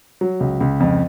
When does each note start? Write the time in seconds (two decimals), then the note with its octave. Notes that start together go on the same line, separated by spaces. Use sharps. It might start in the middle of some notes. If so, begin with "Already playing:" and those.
0.21 F#3
0.40 C#2
0.60 C#2
0.80 F2